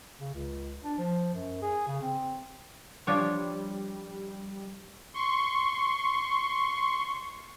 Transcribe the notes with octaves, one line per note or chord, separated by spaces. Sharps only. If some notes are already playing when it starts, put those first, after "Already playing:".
C#3
C#2
D4
F3
F#2
G#4
C#3
C4
F3 G3 D4 C#5
C6 C#6